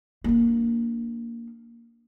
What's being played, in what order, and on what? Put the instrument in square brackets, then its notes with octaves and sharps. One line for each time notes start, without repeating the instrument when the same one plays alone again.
[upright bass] A#3 D4